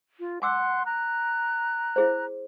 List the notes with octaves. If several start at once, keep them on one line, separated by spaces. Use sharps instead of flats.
F4
F#5 G#5 C6 D6 E6 F#6
A#5 F#6
E4 G#4 C5